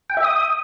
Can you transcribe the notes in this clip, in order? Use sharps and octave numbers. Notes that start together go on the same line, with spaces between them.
G5
E5
D#6